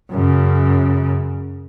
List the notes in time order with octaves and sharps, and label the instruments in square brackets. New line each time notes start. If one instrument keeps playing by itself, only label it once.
[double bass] F#2 C#3